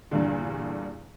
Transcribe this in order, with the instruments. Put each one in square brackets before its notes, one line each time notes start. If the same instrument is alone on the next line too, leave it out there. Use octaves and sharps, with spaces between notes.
[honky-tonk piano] E2 G2 A#2 D3